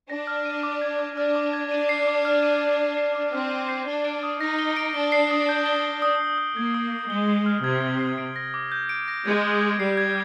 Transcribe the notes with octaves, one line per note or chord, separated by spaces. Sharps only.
D4 A#6
F6
D#7
D6
G#6
D6
D4 F6
D6
G#6
D4 D#7
C7
D6
F6
D#7
C7
D#7
C7
D6
C4 F6
D#7
C7
D4 G7
D7
D#6
D#4 A#6
G7
D7
D4 G7
C7
D#6
G6
G7
C7
D#6
C7
D#6
A#3 G#6
D#6
C7
G#3 G7
C7
F6
C3 G#6
G7
C7
D7
A#6
D6
G6
D7
A#6
G#3 G#6
G7
G#6
G3 C7
G#6